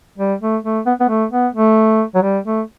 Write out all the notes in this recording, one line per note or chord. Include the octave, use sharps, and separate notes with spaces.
G3
A3
A3
B3
B3
A3
B3
A3
F#3
G3
A3